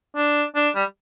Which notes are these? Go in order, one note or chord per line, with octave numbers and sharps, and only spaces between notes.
D4
D4
G3